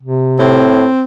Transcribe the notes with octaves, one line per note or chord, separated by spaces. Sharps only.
C3
A2 C4